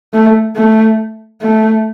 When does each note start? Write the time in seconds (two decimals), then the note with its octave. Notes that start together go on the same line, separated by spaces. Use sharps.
0.13 A3
0.56 A3
1.41 A3